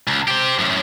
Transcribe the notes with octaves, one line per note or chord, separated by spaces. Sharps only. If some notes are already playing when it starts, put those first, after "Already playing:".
C#2
G4 C5
F#2 A2